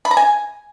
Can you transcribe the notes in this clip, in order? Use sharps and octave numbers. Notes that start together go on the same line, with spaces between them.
B5
A#5
G#5